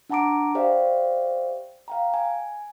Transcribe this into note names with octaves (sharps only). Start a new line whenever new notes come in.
D4 F#5 A5 A#5 D6 D7
G4 C5 D5 E5 F5 G5
F5 G5 A#5
G#5